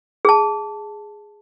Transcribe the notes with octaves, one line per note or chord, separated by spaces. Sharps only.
G#4 A5